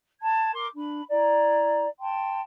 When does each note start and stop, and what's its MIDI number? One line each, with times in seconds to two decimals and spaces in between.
0.21 0.53 81
0.21 0.53 92
0.53 0.67 70
0.53 0.67 84
0.53 0.67 86
0.75 1.01 62
0.75 1.01 83
1.10 1.86 64
1.10 1.86 74
1.10 1.86 82
2.01 2.40 79
2.01 2.40 81
2.01 2.40 84